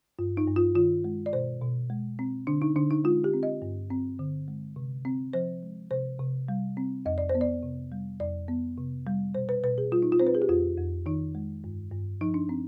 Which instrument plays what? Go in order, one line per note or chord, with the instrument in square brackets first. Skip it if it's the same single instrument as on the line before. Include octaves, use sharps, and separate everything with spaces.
[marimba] G2 F4
D#4
G2
F4
D#3 F4
G#3
D5
B2 C5
B2
G#3
C4
D3 D4
D#4
D3 D4
D#4
G#3 F4
G4
C4
D#5
G2
C4
D3
G#3
C3
C4
F3 C5
G#3
C3 C5
C3
G3
C4
F2 D#5
D5
C5
B3
D5
C3
G3
F2 D5
B3
C3
G3
B2 C5
B4
B2 B4
G#4
G3 F4
D#4
F4
C4 C5
B4
G#4
G4
F2 F4
F2
D#3 D#4
G#3
G2
G2
F3 D#4
D4
C4